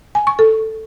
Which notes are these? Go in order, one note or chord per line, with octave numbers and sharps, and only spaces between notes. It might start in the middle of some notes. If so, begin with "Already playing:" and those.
G#5
C#6
A4